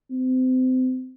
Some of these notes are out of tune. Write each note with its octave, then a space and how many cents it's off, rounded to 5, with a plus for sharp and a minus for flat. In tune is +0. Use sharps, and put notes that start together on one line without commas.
C4 -30